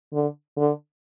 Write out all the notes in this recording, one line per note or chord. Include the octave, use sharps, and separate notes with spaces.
D3
D3